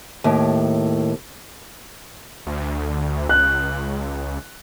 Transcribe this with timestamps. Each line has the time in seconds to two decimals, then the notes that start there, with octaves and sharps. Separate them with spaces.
0.24 D#2 A2
2.47 D2
3.29 C#2 F#6